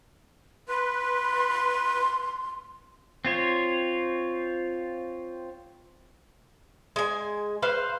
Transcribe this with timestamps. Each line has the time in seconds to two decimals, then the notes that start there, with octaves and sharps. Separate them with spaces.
0.69 B4 C6
3.25 C4 F4 C#5
6.96 G#3 G#5
7.62 B4 C5 F5